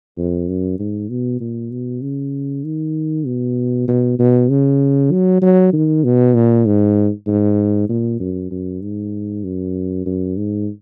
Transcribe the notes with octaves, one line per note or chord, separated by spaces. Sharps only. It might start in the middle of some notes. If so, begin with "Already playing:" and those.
F2
F#2
G#2
B2
A#2
B2
C#3
D#3
B2
B2
B2
C#3
F#3
F#3
D#3
B2
A#2
G#2
G#2
A#2
F#2
F#2
G#2
F#2
F#2
G#2